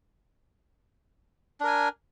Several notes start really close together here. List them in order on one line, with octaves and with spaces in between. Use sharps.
D4 A#4 G#5